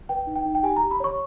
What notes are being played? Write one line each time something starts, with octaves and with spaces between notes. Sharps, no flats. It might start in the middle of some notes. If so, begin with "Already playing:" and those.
B4 G5
D#4
G5
D#4
G5
G4 G#5
G4 A#5
B5
C#5 C#6